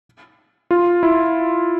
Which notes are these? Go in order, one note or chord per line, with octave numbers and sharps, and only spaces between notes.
F4
E4